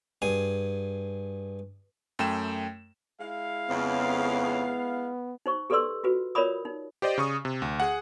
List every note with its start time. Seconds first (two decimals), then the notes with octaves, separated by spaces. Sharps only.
0.22 G2 G#4 G#5
2.19 F#2 A3 G5 E7
3.20 G#3 E4 F5
3.69 F2 C#3 B3
5.46 D#4 C5 C#6
5.70 G4 A4 B4 D5 C6 E6
6.04 F4 F#4 B4
6.35 F4 A#4 C#5 D5 B5 D#6
6.65 D#4
7.02 G4 C5 D5 D#5
7.18 C#3 C#6 D#6
7.45 C3
7.62 D2
7.80 G#4 F#5